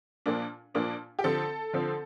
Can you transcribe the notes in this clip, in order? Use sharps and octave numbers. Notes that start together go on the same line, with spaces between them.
A#2 F3 A#3 D4
A#2 F3 A#3 D4
G4
D3 F3 C4 A4
D3 F3 C4